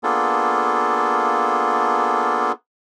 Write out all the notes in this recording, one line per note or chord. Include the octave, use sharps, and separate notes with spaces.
A#3 B3 D4 F4 G#4 A4